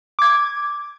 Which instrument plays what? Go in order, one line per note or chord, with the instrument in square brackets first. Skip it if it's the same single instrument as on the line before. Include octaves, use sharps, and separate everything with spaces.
[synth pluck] D6 G#6